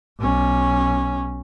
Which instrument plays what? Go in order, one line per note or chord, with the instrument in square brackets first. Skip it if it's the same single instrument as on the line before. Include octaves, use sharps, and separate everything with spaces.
[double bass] B1 C#4